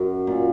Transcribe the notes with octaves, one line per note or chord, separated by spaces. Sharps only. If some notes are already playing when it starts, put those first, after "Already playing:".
Already playing: F#2 D#5
A#2